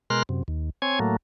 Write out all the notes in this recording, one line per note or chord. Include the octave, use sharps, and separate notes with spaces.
B2 G#3 A#4 C6 F6 F#6
F#2 C3
D#2
C4 C#5 G#5 G#6
A2 F#3 A3 A#3